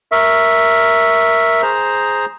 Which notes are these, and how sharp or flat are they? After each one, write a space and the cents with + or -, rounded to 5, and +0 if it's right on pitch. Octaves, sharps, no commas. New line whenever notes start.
A#4 +0 E5 +0 C#6 +0
G#4 +0 C5 +0 A#5 +0